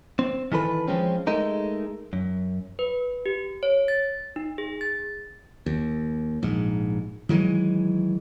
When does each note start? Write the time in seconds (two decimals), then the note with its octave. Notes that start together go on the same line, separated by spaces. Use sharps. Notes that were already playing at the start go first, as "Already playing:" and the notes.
0.19 C4
0.52 D#3 E3 A4 B4
0.88 F3 G#3 C4 C#4
1.27 G#3 A3 D#4 A#4
2.13 F#2
2.79 B4
3.26 G4
3.63 C#5
3.88 A6
4.36 D#4
4.58 G#4
4.81 A6
5.66 D#2
6.43 A#1 G#2
7.29 D#3 E3 F#3 G#3